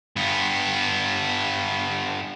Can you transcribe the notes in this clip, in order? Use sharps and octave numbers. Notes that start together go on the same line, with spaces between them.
G2 B3